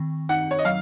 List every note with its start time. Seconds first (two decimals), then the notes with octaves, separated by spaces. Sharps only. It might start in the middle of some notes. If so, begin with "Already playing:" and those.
Already playing: D#3 C4
0.29 D#4 F#5
0.51 C#5
0.59 D#5
0.65 F#3 F5